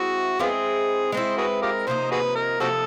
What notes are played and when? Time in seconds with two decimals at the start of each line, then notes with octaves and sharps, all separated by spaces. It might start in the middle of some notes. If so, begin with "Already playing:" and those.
Already playing: G#3 C4 E4 F#4
0.39 G#3 B3 C4 E4 F4 G#4
1.12 G#3 C4 E4 C5
1.37 F#4 G#4 B4
1.62 F4 G4 A#4
1.87 C3 F3 A#3 D#4 C5
2.11 F#4 G#4 B4
2.35 A#4
2.60 C3 F3 A#3 C4 D#4 F#4 A4